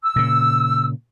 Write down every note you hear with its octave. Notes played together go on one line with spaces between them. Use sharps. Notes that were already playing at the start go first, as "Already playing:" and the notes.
E6
A#2 C#3